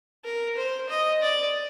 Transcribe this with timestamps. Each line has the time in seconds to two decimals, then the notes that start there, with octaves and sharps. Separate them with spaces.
0.25 A#4
0.57 C5
0.89 D#5
1.22 D5